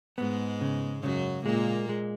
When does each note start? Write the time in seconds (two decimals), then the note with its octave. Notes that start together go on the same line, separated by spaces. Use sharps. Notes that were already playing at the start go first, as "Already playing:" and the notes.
0.18 G#2 G#3 B3
0.61 C#3
1.03 F#2 C#3 F#3
1.45 A#2 G#3 A#3
1.89 G#3